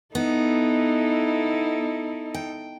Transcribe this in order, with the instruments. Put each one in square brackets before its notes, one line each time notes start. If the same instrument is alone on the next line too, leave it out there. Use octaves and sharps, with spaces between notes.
[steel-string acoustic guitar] B3 [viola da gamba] D#4 E4 A4
[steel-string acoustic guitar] G5